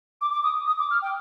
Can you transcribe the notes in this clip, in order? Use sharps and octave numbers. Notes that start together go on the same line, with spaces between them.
D6
D6
D#6
D#6
D6
F6
G5